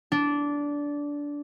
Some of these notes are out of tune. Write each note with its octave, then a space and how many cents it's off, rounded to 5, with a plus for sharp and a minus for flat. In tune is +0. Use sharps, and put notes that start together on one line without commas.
D4 -15